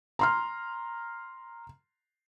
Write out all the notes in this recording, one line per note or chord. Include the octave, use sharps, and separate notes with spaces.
A#5 C6 F6